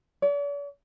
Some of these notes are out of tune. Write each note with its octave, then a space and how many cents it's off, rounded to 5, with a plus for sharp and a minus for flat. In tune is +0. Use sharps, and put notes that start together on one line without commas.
D5 -45